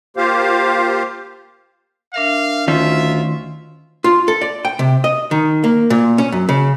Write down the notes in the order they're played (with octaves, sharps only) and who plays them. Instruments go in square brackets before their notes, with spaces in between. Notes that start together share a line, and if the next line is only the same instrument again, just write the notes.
[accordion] A#3 F4 G4 C5 F5
[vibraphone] D4 A#4 E5 [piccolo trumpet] F5
[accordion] D2 F4 [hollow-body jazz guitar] D#3 C#4 [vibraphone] A3 [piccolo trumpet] E5
[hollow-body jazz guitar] F4
A4
D5
G5
C3
D#5
D#3
A#3
A#2
C#4
F#2
C#3